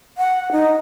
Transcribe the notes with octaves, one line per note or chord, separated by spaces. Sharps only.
F#5
D#4